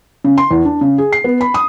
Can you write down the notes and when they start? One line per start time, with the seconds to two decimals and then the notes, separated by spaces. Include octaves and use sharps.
0.24 C#3
0.38 C6
0.51 E2
0.65 D4
0.81 C#3
0.98 G#4
1.13 C7
1.24 B3
1.41 B5
1.54 D#6